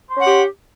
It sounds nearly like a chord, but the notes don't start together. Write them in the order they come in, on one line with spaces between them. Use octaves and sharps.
C5 C#4 F#5 G4